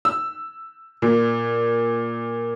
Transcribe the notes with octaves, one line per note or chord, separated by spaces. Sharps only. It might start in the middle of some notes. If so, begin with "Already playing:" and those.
E6
A#2